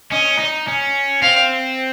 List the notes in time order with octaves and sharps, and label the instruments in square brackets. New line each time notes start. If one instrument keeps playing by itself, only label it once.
[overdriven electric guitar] C#4 [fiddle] D#5
[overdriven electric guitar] D#4
C#4
[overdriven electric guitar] C4 [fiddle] F5